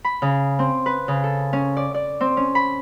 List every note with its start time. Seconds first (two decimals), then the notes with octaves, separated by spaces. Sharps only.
0.04 B5
0.22 C#3
0.59 C4
0.86 B4
1.08 C#3
1.24 A4
1.53 C#4
1.77 D5
1.94 D5
2.21 C4
2.37 C#4
2.55 B5